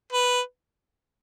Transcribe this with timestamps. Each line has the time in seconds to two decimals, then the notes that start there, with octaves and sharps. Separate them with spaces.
0.13 B4